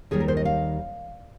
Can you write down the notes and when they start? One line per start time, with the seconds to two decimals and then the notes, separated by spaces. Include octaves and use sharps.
0.11 D#2 D#3 G3 G#4
0.20 A#4
0.28 C5
0.37 D#5
0.45 F5